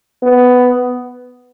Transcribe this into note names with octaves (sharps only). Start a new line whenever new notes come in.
B3